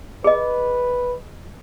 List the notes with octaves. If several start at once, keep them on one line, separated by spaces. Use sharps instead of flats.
G#4 B4 D#5